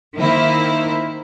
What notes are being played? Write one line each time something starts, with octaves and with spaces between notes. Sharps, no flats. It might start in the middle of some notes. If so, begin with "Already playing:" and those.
D#3 A#3 E4 C5